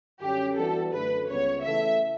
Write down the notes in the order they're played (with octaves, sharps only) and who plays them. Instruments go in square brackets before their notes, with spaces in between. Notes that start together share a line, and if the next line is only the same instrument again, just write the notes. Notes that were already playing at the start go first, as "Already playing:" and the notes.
[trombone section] F#2 D3 G3 C#4 [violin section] G4
[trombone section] E3 G3 B3 D4 F#4 [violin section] A4
[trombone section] F#2 D3 A3 D4 [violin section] B4
[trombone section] C#2 C#3 G3 B3 [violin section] C#5
[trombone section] C#3 E3 A3 E4 A4 [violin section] E5